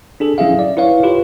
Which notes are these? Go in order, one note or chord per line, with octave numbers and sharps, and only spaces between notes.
D4 G#4 A4
F#3 C#4 E4 G#4 E5 F5
D5
E4 B4 C#5 F5
F4 G4 B4 C#5